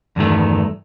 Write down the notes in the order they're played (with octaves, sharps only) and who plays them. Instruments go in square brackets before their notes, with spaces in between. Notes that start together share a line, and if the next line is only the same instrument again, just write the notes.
[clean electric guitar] E2 G2 D#3 A3